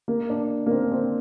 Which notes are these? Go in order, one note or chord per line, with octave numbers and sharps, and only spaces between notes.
A#3
D4
A#3
C4
D4
C4